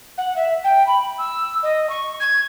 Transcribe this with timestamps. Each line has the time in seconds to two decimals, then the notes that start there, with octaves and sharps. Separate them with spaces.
0.18 F#5
0.36 E5
0.64 G5
0.87 B5
1.18 E6
1.63 D#5
1.89 C#6
2.20 G#6